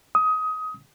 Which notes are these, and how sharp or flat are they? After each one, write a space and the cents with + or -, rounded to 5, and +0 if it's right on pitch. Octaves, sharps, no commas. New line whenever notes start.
D#6 +20